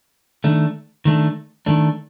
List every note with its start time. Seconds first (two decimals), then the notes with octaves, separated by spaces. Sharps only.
0.44 D#3 A3 D4
1.05 D#3 A3 D4
1.66 D#3 A3 D4